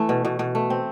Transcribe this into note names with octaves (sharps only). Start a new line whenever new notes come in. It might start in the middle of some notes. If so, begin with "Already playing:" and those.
Already playing: E3 A3
B2
B2
B2
A3
C4